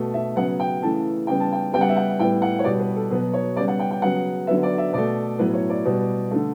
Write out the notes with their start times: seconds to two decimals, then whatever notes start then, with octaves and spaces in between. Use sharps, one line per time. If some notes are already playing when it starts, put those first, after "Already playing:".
Already playing: B2 A3
0.14 E5
0.36 C#3 F#3 B3 F#5
0.60 G5
0.82 C#3 E3 A3 A5
1.27 C#3 G3 B3 G5
1.40 A5
1.53 G5
1.73 C#3 G3 B3 G5
1.81 F#5
1.89 E5
1.97 F#5
2.19 A2 G3 B3 G5
2.42 F#5
2.59 C#5
2.64 B2 G3 B3 D5
2.80 B4
2.96 A4
3.10 B2 F#3 B3 B4
3.34 C#5
3.57 C#3 G3 B3 D5
3.68 F#5
3.79 G5
3.91 G5
4.02 C#3 F#3 B3 F#5
4.47 D3 F#3 B3 E5
4.63 D5
4.78 E5
4.93 B2 A3 D5
5.39 A2 F#3 B3 B4
5.54 C#5
5.70 D5
5.85 B2 G3 B3
6.31 D3 A3